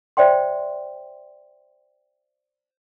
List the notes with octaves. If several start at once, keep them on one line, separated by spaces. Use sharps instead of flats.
C5 D5 E5 G5 C6